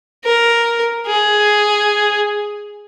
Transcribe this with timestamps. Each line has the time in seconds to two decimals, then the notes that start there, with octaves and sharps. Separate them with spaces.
0.24 A#4
1.05 G#4